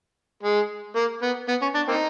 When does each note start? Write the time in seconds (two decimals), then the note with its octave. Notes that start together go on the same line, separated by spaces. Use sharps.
0.43 G#3
0.95 A#3
1.22 B3
1.48 B3
1.62 C#4
1.75 D4
1.88 A#3 C4 D#4